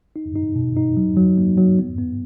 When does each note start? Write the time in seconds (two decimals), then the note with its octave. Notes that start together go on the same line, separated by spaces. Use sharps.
0.16 D#4
0.36 D#4
0.56 B2
0.77 D#4
0.97 F#3
1.17 F#3
1.38 A#3
1.57 F#3
1.79 B3
1.98 B3